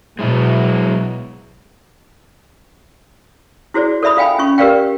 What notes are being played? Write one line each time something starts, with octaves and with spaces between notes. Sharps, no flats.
B2 F#3 G#3 E4
E4 F#4 G#4 C5 D5
A4 D5 E5 B5 D#6
F4 F5 G5 G#5 B5
C#4 F4 C#6
G4 A#4 B4 D5 F5 G5